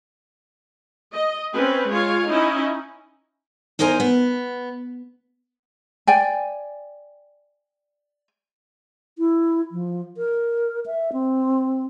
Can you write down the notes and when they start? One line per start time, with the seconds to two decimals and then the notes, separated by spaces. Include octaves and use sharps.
1.13 D#5
1.53 C4 C#4 B4
1.90 G#3 F4 C#5 F5
2.29 C#4 D#4 E4 D#5
3.79 E2 D#4 A#4 C5 G#5
4.00 B3
6.07 D5 G5 G#5
9.18 E4
9.72 F3
10.17 A#4
10.86 E5
11.13 C4